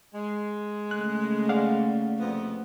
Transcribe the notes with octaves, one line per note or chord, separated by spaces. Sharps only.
G#3
C#3 A3 A#3 F#6
D5 F5 F#5
F2 C3 B3